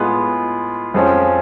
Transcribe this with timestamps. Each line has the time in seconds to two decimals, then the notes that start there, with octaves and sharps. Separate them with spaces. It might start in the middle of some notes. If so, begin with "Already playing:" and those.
Already playing: A2 G#3 B3 F4
0.94 F2 F3 G#3 C#4